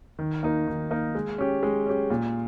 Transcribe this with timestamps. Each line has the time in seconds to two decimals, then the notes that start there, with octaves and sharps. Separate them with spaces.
0.19 D#3
0.43 A#3 D#4 A#4
0.67 D#3
0.91 A#3 D#4 A#4
1.15 G#3
1.38 C#4 G4
1.63 G#3
1.87 C#4 G4
2.10 A#2